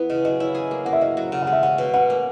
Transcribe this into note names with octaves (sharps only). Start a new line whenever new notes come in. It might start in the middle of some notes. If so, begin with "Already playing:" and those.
Already playing: E3 B3 E4
C#3 D#5
F#3 D#5
E4 C#5
G#4
A#3
A#3 F#5
E5
F#3 D#5
F#3
C#3 F#5
F#5
G#3
E5
C#4 F#5
B2
C#4 F#5
A#3